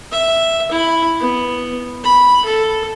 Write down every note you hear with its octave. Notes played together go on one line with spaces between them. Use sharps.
E5
E4 B5
B3
B5
A4